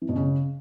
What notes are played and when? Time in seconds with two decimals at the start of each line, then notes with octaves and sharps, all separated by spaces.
0.02 E3
0.09 B2
0.16 C#3